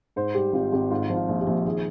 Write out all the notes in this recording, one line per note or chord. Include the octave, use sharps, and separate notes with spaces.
G#2 C5
G3 G4
G#1 F4
G#1 G4
G#2 F4
F3
F4
A#1
G4
A#1
D#3 G#4